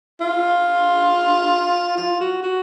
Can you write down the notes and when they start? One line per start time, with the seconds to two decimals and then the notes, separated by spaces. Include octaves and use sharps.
0.21 F4
1.98 F4
2.21 F#4
2.43 F#4